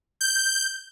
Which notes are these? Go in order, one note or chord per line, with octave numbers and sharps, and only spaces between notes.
G6